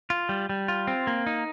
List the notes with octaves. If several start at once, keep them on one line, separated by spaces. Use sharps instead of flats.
F4
G3
G3
F4
C4
A#3
D#4